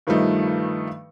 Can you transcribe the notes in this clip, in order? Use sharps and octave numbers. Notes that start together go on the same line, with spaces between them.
G2 D#3 F3 G3 A3 D#4